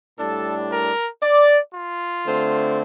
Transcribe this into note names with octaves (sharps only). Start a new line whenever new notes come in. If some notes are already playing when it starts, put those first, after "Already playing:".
A2 G3 D4 A4
A#4
D5
F4
D3 A3 C4